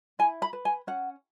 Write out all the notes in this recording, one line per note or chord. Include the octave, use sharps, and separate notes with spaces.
E4 G#5
B5
B4
G#5
C#4 F#5